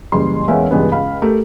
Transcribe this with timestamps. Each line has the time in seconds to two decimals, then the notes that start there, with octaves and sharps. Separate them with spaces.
0.12 F#1 E3 G3 G#4 C6
0.48 E2 G#3 C#4 A#4 E5 F5
0.71 C#2 G2 E3 G#3 B3
0.92 C#2 F5 B5
1.22 A3 G4 A#4